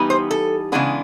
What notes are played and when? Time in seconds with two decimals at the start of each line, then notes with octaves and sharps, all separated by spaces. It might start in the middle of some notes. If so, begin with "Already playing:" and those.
Already playing: E3 G3 B3 D#4
0.10 C5
0.31 A4
0.72 C#3 E3 G#3 B3 D4